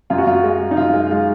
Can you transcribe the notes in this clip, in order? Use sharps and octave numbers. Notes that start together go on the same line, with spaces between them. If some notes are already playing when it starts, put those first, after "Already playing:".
F#2 F4
F#4
F#2 F4
G#3
G#3
D#4
F#2 F4
G#3
G#3 F4